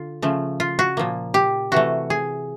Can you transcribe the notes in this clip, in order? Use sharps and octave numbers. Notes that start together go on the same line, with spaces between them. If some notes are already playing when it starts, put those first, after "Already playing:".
Already playing: D3 F4
C#3 F3 A3
F4
F#4
A#2 F3 A#3
G4
C3 E3 A3 F#4
G#4